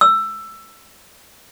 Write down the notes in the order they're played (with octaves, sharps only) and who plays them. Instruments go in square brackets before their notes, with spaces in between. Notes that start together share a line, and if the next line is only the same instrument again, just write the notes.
[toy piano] E6